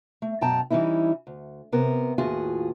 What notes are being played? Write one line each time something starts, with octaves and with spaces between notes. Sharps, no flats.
A3
F#2 B2 G5 A5 A#5
E3 G3 C#4 D#4 E4
D2
C3 B3 A#4
D#2 A2 F4 F#4 G#4